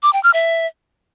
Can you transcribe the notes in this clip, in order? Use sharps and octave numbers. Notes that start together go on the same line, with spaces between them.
D6
G5
F6
E5